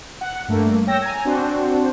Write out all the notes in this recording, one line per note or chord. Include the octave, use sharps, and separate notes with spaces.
F#5
G2 A3 A#3
C#5 G5 E6 A#6
G#5 A#5
C4 D4 F#4 C5